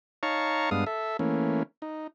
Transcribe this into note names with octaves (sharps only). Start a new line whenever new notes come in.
D#4 C#5 F5 A5 A#5 C#6
G2 G#3 B3 D4 F5 D#6
A4 E5
E3 A3 A#3 C#4
D#4